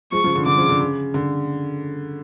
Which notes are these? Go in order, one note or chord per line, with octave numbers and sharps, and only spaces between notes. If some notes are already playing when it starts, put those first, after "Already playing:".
F3 G#3 C#6
C#3 F3
D3
D3 D6
C#3 F3
D3
C#3
D3